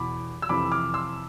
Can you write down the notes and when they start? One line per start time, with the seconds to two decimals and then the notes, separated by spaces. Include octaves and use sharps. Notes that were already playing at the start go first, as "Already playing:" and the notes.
Already playing: E2 B2 B5 D6
0.42 E6
0.49 F2 C3 E3 B5 D6
0.72 D6 F6
0.94 C6 E6